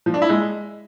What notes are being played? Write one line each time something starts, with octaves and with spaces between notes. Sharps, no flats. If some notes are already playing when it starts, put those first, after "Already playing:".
F3
D4
E4
G#3